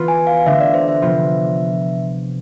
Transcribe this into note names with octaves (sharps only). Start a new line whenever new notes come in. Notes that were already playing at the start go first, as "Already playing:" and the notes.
Already playing: E3 B3 F4 B4
G#5
F5
F5
D3 A3 D4 E5
D5
C5
E5
C3 F3 B3 F4